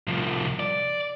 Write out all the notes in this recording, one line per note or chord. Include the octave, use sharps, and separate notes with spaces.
C2 F3
D5